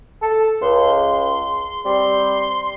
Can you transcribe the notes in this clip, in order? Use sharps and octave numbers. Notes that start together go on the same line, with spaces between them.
A4
C#2 C6
G3 C4 C6